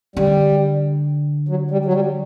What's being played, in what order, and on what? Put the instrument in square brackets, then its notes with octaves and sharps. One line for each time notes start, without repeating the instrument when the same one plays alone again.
[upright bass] D3 [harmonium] G3
[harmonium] F#3
G3
F#3
G3